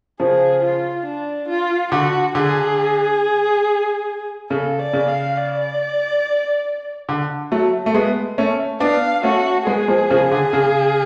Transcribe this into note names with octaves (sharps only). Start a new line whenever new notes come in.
C#3 F3 G#4
F4
D4
F4
D3 F#4
D3 G#4
C#3 A4
D5
C#3
F5
D5
D3
F#3 A3
A3
G#3 B3
A3 C#4
B3 D4 F5
A3 C#4 F#4
G#3 B3 G#4
F3 G#3
C#3 F3
D3
C#3